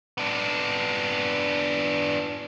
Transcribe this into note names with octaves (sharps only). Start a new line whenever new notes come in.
B3 D4